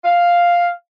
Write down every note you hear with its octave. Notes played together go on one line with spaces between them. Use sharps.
F5